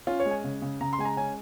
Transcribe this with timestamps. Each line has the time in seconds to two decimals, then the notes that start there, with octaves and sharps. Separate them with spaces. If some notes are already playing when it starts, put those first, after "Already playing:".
0.07 C#4 F4
0.20 C#5
0.26 G#3
0.31 G#5
0.44 C#3
0.62 C#3
0.81 C#3 A#5
0.93 C6
0.99 G#3 G#5
1.05 A#5
1.17 C#4 G#5